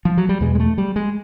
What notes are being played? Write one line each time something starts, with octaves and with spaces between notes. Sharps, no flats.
F3
F#3
G3
E2 B2 G#3
G#3
A3
G3
G#3